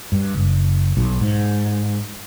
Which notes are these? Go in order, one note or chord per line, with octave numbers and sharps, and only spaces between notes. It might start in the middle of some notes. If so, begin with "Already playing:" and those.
G2
F#1
B1
G#2